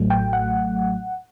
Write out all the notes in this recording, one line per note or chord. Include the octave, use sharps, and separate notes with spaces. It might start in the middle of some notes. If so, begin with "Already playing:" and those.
Already playing: A1 A2 F#3 A3
G5
F#5